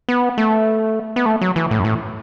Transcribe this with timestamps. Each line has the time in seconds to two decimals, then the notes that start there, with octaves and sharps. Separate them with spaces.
0.09 B3
0.38 A3
1.16 B3
1.26 A3
1.41 F#3
1.56 E3
1.71 A2
1.79 F#2
1.84 A2